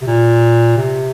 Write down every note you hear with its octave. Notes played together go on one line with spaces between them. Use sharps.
C3
A#2
C3